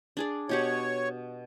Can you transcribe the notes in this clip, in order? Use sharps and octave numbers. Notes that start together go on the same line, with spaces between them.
D4 G#4 D5
B2 G4 C#5 F#5